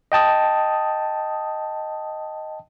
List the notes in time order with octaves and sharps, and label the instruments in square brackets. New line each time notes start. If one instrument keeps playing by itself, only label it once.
[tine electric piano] D#5 G5 A5 D#6